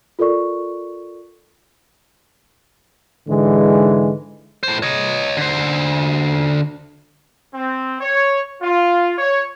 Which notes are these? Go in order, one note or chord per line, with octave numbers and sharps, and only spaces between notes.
F4 A4 A#4 D5 C#6
G#2 D3 E3 G#3
A2 C5
C#5 D#5
D3 C5
C4
C#5
F4
C#5